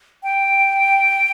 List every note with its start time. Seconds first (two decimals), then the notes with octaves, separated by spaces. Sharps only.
0.23 G5